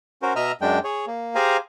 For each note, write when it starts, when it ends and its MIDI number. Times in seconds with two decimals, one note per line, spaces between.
0.22 0.33 61
0.22 0.33 66
0.22 0.33 70
0.22 0.33 72
0.36 0.52 47
0.36 0.52 75
0.36 0.52 76
0.36 0.52 82
0.36 0.52 88
0.36 0.52 89
0.61 0.79 42
0.61 0.79 56
0.61 0.79 62
0.61 0.79 79
0.84 1.06 68
0.84 1.06 73
1.07 1.35 58
1.35 1.57 67
1.35 1.57 68
1.35 1.57 72
1.35 1.57 77
1.35 1.57 80
1.35 1.57 82